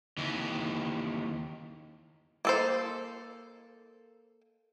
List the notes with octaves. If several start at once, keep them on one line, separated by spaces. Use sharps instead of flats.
D#2 E3
A#3 A4 C5